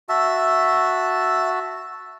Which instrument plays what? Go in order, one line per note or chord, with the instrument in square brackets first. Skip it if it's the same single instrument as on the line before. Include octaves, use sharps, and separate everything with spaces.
[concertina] F#4 A5 E6 [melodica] E5